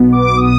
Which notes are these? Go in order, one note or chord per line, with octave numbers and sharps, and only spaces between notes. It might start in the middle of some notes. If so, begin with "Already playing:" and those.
Already playing: B1 B2 B3
D6
D#6